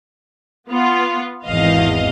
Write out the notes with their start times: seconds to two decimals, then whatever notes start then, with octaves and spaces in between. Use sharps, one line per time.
0.70 B3 F4
1.46 G#1 E2 D#5 F5